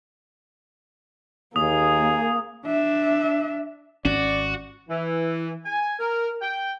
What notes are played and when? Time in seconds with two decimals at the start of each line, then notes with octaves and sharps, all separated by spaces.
1.56 D#2 A#3 G#4 D#6
2.65 D4 E5
4.05 G#1 C#4 F#4 D5
4.89 E3
5.65 G#5
5.99 A#4
6.42 G5